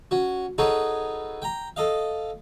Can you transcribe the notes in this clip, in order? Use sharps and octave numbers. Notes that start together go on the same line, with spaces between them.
C#4 F#4
D#4 F#4 G#4 A4 B4 C#5
G5 A#5
A4 D#5 F5